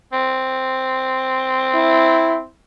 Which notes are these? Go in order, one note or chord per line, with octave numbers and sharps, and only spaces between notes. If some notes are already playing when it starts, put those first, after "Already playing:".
C4
E4